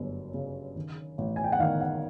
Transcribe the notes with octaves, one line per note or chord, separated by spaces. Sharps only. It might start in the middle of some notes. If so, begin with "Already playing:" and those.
Already playing: G1 F#2
C#3
D#3
A1
G#5
G5
F#5
D#3 F5
F#5